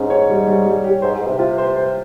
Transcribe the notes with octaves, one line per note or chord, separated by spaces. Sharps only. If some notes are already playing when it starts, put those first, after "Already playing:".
Already playing: G#2 C#4
C#5
G3
G3
G3
G4
G#2 C5
G#2
C5
C3
C3 F4
C5
C5